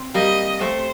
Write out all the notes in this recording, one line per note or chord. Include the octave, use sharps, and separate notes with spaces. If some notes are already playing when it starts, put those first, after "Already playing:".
Already playing: C4
G3 A#3 D#5
A3 C4 C5